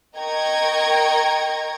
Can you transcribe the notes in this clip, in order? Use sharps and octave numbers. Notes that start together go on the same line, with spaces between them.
A#4 D#5 G5 A#5 C#6 G#6